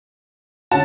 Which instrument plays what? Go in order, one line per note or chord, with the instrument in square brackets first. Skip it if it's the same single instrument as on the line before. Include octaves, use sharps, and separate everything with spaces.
[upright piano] D3 C#4 F#4 [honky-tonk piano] A5